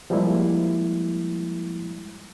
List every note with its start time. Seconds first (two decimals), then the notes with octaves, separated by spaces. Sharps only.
0.10 F3 G3 G#3 A#3 E4